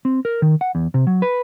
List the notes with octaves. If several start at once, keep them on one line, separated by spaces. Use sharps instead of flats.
C4
A#4
D#3
F#5
E2
C3
F#3
B4